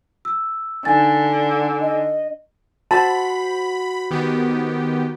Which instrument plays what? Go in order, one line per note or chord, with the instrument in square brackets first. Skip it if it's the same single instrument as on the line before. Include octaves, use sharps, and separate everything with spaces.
[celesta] E6
[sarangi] D3 [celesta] D#4 G#5 A6
[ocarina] D#5
[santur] F#4 C5 [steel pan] A5 [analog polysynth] B5
[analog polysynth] D#3 B3 G4